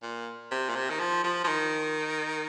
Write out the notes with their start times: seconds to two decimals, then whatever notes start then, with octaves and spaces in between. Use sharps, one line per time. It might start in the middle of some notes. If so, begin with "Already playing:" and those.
0.03 A#2
0.52 C3
0.69 A#2
0.76 C3
0.90 D#3
1.00 F3
1.24 F3
1.44 F3
1.48 D#3